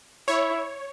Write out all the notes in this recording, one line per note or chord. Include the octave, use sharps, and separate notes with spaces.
E4 C#5